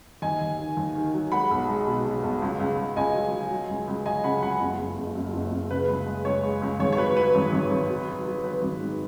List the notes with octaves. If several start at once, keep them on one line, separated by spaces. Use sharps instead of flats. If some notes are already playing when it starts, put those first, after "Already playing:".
D#2 D#5 G#5
D#2
D#3
D#2
D#3
F#3
G#3 F#5 B5
B1
G#3
B2
B2
B1
C#2
C#2
C#2
C#2 D#5 G#5
F#3
F#3
F#3
C#2
C#2
F#3 D#5 G#5
C#3 F#5 B5
C#2 F#5 B5
F#1
F#1
F#1
F#2
F#1
F#1
C#3 B4
C#2
G#3
C#2 C#5
G#3
C#2
G#1 C#5
C#5
F#3 B4
F#3 B4
G#1
G#1
G#1
F#3
F#3
F#3
F#3 B4
G#1
G#2